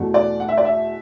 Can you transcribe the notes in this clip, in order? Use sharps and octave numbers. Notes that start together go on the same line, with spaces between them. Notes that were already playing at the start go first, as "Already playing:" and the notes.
Already playing: E2 B2 A3
D5
F#5
E5
D5
E5